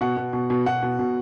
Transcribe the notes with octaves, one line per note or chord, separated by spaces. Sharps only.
B2 F#5
B2
B2
B2
B2 F#5
B2
B2